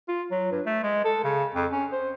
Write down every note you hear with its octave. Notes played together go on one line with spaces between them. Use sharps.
F4
F#3
G2
A3
G#3
A4
C#3
F2
C#4
C5